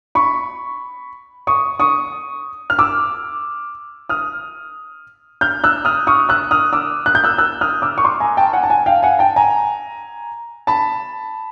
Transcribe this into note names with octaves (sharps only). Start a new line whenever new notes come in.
B5 C#6
C#6 D#6
C#6 D#6
F6
D6 E6
D#6 F6
F6 G6
E6 F#6
D#6 F6
C#6 D#6
E6 F#6
D#6 F6
D6 E6
F#6
G6
E6 F#6
E6 F#6
D#6 F6
D6 E6
C#6
C6 D6
G#5 A#5
G5 A5
F#5 G#5
A5
F#5 G#5
F5 G5
F#5 G#5
G5 A5
G#5 A#5
A5 B5